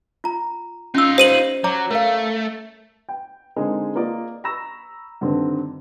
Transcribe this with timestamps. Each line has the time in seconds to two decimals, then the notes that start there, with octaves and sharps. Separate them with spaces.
0.24 F4 A#5
0.95 C#4 D#4 F4 E6
1.18 G4 C5 D#7 F#7
1.64 F#3 C#5 A#5 D6
1.91 A3 A#4 F5
3.09 G5
3.56 D3 G#3 C4 D#4 G#4 A#4
3.95 A#3 F4 D5 D#5
4.44 A#5 B5 C#6 E6 A#6 E7
5.21 G2 D3 D#3 C4